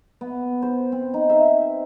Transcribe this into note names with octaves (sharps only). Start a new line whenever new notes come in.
B3
C5
C4
D#4
E5